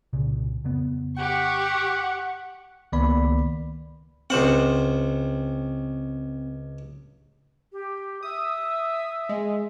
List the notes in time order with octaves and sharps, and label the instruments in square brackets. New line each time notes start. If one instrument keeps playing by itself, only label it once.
[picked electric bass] C2 A#2 C#3
F2 C#3 B3
[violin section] G4 C#6 [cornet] F#5
[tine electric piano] C#2 D#3 A#3 B3 D5 B5
[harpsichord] C#2 C5 F#5 [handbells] C4
[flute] G4
[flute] E5 [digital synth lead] D#6
[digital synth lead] G#3